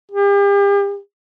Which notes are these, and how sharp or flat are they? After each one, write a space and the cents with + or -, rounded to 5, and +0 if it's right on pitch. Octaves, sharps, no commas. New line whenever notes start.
G4 +40